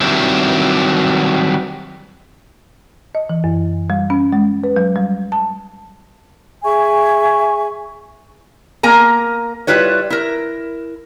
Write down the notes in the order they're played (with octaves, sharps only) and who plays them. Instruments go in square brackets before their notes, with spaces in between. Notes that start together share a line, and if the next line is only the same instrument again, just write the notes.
[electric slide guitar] D#3 F#3 G3 C4 D4 E4
[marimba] D#5
E3
F#2
G3
C#4
G#3
B4
F#3
G3
A5
[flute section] G#4 E5 G#5 C#6
[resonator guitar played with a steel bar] A#3 A#4 G#5 A#5
G3 E4 F4 B4 C#5
E4 A#4